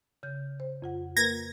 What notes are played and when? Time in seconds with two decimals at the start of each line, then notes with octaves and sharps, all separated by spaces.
0.23 C#3 G6
0.60 C5
0.82 F2 F4 F#5
1.17 A#3 A#4 B4 G#6 A#6